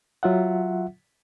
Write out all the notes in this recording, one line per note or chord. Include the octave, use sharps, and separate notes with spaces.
F#3 F4 E5 F#5